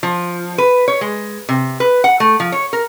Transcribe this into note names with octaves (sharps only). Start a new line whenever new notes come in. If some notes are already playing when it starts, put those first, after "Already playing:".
F3
B4
C#5
G#3
C3
B4
F#5
A3
F3
C#5
A#4